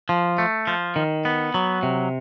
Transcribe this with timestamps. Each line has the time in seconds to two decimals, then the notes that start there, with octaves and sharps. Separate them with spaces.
0.09 F3
0.38 A3
0.67 F3
0.96 D#3
1.25 B3
1.54 F#3
1.83 C3